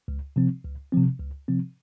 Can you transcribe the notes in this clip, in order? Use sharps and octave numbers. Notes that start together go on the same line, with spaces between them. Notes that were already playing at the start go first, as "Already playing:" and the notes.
C#2
C3 F3 C4
C#2
C3 F3 C4
C#2
C3 F3 C4